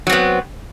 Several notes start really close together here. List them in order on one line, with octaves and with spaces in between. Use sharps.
F#3 C4 B3